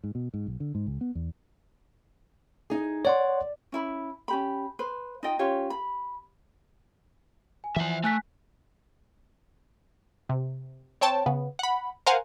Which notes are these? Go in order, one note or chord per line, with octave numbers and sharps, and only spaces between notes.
G#2
B2
G#2
B1
D3
G#2
C#2
B3
E2
D#4 G#4
C#5 D5 F#5 C6
C#4 E4 B5
C#4 G4 B5
B4 C5
D#4 F4 D#5 G5
C#4 F4 G4 C#5
B5
G#5
E3 F3 E5 F#5
A3 G#5 F#6 B6
C3
C4 C#5 G5 A5
C#3 B3
F#5 B5
A#4 C5 F5 F#5 G#5